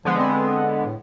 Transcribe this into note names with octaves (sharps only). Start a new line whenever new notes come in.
D3 F3 G#3 B3
C4
A2